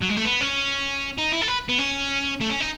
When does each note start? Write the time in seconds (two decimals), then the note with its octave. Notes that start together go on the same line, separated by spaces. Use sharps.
0.02 F#3
0.10 G#3
0.17 A3
0.25 B3
0.41 C#4
1.18 D#4
1.32 E4
1.42 A4
1.48 B4
1.69 B3
1.79 C#4
2.41 A3
2.50 C#4
2.60 D#4